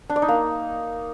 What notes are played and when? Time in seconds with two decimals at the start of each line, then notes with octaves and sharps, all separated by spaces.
0.10 D4
0.16 D5
0.22 D#4
0.28 A#3